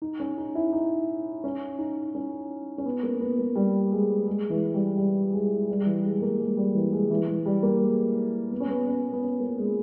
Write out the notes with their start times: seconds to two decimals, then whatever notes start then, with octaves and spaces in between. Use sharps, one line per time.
0.02 D#4
0.20 C#4
0.38 D#4
0.55 E4
0.72 D#4
1.44 C#4
1.79 D#4
2.15 C#4
2.78 C#4
2.85 B3
3.03 A#3
3.20 B3
3.38 A#3
3.56 G3
3.92 G#3
4.27 G#3
4.50 E3
4.74 G3
4.97 G3
5.33 G#3
5.69 G3
5.81 G3
5.86 E3
6.04 G#3
6.17 G#3
6.22 A#3
6.40 G#3
6.57 G3
6.75 E3
6.93 G#3
7.10 E3
7.28 E3
7.46 G3
7.63 A#3
7.81 G#3
8.51 B3
8.60 C#4
8.68 B3
8.87 C#4
9.13 B3
9.22 C#4
9.40 A#3
9.58 G#3